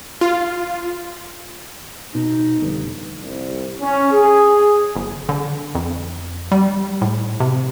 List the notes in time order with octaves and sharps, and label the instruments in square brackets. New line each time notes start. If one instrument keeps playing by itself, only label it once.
[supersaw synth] F4
[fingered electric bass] B2 [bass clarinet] D#4
[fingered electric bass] F1 [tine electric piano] D3 G3 B4
[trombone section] C2
C#4
G#4
[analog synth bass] G1
D3
F2
G3
A2
C3